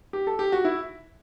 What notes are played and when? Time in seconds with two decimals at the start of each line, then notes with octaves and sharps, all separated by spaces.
0.13 G4
0.27 A4
0.39 G4
0.52 F#4
0.65 E4